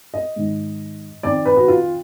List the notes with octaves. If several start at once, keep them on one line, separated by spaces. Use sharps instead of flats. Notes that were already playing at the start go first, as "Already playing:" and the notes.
D#5
G#2 D#3
F2 D#3 D5
B4
F#4
F4